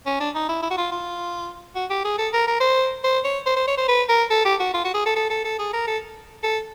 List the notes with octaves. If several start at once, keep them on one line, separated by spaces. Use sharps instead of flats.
C#4
D4
D#4
E4
E4
F#4
F4
F4
F#4
G4
G#4
A4
A#4
A#4
C5
C5
C#5
C5
C5
C#5
C5
B4
A#4
A4
G4
F#4
F4
F#4
G#4
A4
A4
A4
A4
G#4
A#4
A4
A4